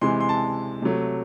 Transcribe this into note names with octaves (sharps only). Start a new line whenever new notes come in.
C3 E3 G#3 C6
C6
A5
C3 F#3 A3